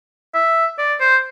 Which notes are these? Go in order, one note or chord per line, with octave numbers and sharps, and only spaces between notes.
E5
D5
C5